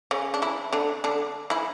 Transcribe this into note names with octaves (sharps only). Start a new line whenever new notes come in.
C#3 C#4
D4
E3 E4
D3 D4
D3 D4
E3 E4